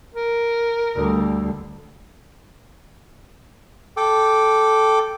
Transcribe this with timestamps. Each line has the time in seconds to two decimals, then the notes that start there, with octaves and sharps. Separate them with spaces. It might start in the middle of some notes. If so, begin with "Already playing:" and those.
0.14 A#4
0.96 D2 G3
3.97 A4 G5 D6